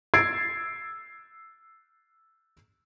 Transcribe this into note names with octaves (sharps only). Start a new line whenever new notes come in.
E6 G#6 A6 C7 D7